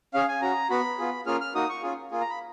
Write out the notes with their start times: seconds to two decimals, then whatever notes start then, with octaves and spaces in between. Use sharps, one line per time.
0.14 C#4 G#4 F5
0.28 G#5
0.41 C#4 F#4 A#5
0.70 B3 F#4 B5
0.98 B3 F4 G#4
1.26 A#3 C#4 F4 G#4 F6
1.41 F6
1.55 A#3 D#4 F#4 D#6
1.69 C#6
1.83 C#4 F4 G#4
2.10 A#3 F4 G#4
2.21 A#5
2.30 B5